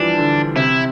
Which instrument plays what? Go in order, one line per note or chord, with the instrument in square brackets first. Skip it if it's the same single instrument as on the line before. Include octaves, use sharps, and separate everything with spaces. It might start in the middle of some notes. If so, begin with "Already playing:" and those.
Already playing: [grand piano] E3 F3 G3 [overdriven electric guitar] D4
[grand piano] D3
[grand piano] C3 [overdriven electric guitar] E4